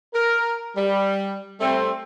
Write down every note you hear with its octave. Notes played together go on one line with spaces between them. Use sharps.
A#4
G3
G3 A3 C4